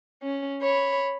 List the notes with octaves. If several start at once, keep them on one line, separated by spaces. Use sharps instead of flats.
C#4
C#5 B5